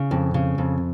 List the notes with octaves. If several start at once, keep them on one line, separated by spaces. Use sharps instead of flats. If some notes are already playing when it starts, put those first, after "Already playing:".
Already playing: C#3
F2
C#3
F2